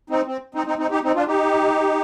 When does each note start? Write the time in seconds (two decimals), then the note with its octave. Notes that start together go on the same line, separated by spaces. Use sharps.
0.10 C4 D#4
0.26 C4
0.55 C4 D#4
0.67 C4 D#4
0.78 C4 D#4
0.91 D#4 G4
1.03 C4 D#4
1.15 D4 F4
1.27 D#4 G4